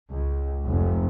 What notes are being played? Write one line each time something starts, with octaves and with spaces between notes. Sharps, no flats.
C#2
F1